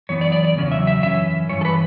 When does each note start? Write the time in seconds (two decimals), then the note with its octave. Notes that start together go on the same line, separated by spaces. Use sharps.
0.09 F#2 E3 B3 C#5
0.21 D5
0.32 D5
0.45 D5
0.57 E2 C#3 F#3 C#4
0.72 E5
0.87 E5
1.03 F#2 E3 C#4 E5
1.49 G2 E3 C#5
1.61 A4
1.65 B4